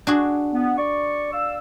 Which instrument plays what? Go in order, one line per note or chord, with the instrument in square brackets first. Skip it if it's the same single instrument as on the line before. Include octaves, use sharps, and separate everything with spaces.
[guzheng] D4 F#4 G#4
[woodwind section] B3
D5 C#6
D5 F5 E6